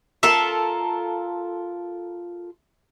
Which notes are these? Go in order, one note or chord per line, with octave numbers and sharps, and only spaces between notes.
F4 A4 A#4 E5